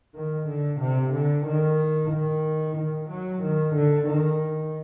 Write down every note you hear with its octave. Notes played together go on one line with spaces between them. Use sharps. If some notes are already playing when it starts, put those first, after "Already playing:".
D#3
D3
C3
D3
D#3
D#3
D#3
F#3
D#3
D3
D#3